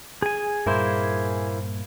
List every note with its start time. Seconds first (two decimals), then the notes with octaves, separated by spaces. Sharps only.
0.22 G#4 G#5
0.66 G2 A#2 A#3 E4 C5